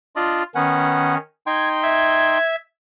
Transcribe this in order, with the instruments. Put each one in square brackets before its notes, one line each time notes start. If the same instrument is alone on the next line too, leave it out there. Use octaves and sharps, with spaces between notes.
[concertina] D4 D5 D#5 [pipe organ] F4
[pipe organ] D#3 C#4 [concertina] B3 F#5
[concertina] D#4 G5 C6 [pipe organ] G#6
[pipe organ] E5 G#6